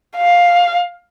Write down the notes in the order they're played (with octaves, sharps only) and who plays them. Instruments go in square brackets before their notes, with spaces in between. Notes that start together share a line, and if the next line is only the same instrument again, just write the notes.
[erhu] F5